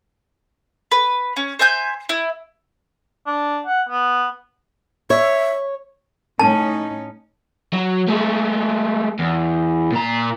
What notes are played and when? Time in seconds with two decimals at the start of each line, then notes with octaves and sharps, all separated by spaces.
0.92 B4
1.37 C#4
1.59 C5 E5 G#5 G6
2.09 E4
3.27 D4
3.67 F#5
3.89 B3
5.10 C#5 E5
6.39 A2 C#4 D#4 A5
7.73 F#3
8.08 G#3 A3
9.19 E2
9.92 A#2 A#5